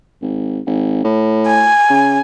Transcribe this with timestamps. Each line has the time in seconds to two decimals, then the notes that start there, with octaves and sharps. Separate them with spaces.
0.22 G#1
0.66 G#1
1.04 A2
1.47 G#5
1.90 C#3